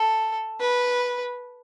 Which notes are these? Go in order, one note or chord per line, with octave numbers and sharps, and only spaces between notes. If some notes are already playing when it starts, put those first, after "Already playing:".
Already playing: A4
B4